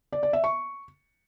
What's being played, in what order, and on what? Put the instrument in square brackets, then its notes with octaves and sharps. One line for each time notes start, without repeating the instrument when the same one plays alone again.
[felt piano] D5
D5
E5
C#6